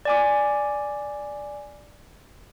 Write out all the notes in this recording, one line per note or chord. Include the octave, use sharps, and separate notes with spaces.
D5 G#5 D6